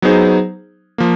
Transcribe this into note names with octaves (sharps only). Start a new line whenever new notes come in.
F#3 B3 D#4 G#4 C5
F3 A#3